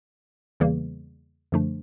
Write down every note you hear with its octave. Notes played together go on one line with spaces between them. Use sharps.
E2 C#3 E3 G3 A#3
F#2 D3 F3 A3 D4